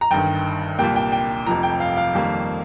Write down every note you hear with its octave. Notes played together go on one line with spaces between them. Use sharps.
A#5
G1 G2 D#3 G5
C2 A#2 G3 A#3 G5
G5
G5
F1 F2 C3 F3 A#5
G5
F5
F5
F2 D#3 G3 A#3